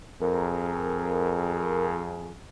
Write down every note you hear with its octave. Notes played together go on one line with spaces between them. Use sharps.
F2 G#4 A#4